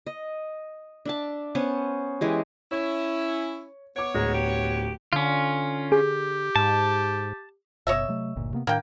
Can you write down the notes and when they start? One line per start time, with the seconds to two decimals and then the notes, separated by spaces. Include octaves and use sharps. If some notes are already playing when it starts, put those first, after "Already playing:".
0.06 D#5
1.05 D4 E5 A5
1.55 B3 C#4 C5
2.21 E3 G#3 G4
2.71 C#4 E4 C#5
3.96 B3 C#5 D6 D7
4.15 D1 G#3 A#5
4.34 G4
5.13 D3 C#4 F4
5.92 G4 G#4
6.56 G#2 A5
7.87 F#1 B2 C#5 D#5 E5
8.08 C3 F#3 A3
8.36 G1 D2 A#2
8.53 C3 A#3 B3
8.67 A2 D#3 A#3 D4 G5